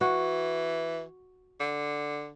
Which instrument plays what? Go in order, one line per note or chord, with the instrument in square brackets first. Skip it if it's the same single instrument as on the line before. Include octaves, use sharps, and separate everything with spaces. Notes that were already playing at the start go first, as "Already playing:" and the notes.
[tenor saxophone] E3 [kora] F#4
[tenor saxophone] D3